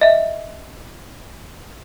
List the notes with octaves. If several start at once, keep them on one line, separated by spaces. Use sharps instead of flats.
D#5 E5